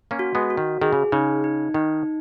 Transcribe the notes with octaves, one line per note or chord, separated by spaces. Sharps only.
A#3 C#4
F#4
G#3 B3
F#4
D#3
D#3 G#4
C#3
C#3 D#4
D#4
D#3 D#4